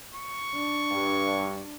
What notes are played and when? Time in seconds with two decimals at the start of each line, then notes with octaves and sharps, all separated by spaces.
0.14 C#6
0.55 D4
0.91 G2